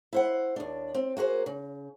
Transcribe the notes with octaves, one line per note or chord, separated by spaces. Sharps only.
E4 C5 F#5
D#2 D4
C4
A#3 F#4 G#4 C5
C#3